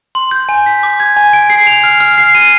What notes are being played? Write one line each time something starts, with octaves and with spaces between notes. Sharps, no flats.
C6
G6
G#5
B6
D6
G#6
G#5
D7
C7
F7
F6
F6
C7
D#7